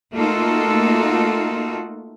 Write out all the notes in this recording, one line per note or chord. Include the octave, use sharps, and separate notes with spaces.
A3 A#3 D#4 F4 F#4 A4